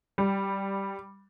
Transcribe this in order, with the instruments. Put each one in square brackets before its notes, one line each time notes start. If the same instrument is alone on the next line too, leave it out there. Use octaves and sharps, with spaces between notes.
[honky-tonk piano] G3